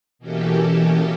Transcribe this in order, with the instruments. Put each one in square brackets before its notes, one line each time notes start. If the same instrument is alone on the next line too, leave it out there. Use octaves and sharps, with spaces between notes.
[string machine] B2 E3 A#3 C#4 G4 A4